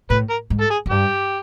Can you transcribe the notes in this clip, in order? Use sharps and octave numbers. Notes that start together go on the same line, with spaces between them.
A2 B4
A#4
G#2
A4
G#4
F#2
G2 G4